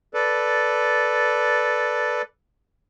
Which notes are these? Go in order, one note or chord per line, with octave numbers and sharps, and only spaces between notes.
A4 B4 D5